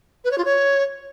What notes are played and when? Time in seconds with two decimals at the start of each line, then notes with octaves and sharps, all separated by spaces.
0.24 B4
0.31 C#5
0.38 F4
0.44 C#5